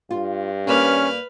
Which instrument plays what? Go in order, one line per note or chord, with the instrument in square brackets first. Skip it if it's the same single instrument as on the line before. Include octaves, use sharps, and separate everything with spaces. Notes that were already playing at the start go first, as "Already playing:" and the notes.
[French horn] G2 [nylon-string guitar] F4
[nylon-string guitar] A#3 D5 [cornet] C#4 [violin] B4 F6